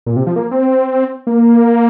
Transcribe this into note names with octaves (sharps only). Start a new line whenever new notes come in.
A#2
C3
F3
A#3
C4
A#3